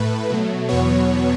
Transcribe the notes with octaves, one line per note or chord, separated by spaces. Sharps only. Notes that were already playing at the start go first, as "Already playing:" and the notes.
Already playing: A2 A3 B4
B2 F#3 A3
E2 B2 F#3 B3 C#5